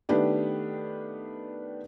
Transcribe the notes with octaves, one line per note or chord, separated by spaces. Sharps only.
D#3 A3 B3 D4 G4